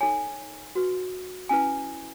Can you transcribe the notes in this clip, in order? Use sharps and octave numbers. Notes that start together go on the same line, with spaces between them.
D#4 A4 C#5 G#5
F#4 B4
C#4 E4 B4 G#5